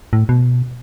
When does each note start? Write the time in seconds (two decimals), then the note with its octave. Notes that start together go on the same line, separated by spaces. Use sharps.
0.13 A2
0.29 B2